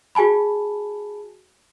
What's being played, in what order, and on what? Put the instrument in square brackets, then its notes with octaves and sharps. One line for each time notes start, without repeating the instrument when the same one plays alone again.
[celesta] F#4 G#4 G#5 A5 B5